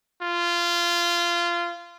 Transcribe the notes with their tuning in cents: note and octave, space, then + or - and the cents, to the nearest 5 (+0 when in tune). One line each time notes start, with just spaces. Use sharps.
F4 -20